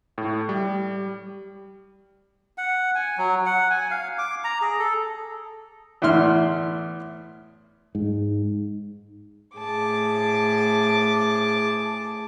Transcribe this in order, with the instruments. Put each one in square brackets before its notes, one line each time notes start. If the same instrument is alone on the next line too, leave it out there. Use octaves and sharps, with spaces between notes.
[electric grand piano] A2
G3
[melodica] F#5
G#5
F#3
F#5
G#5
F5
D6
A#5
G#4
A4
[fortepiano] E2 A2 E4 C6 F6
[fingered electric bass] G#2
[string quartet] A2 G#4 A5 D6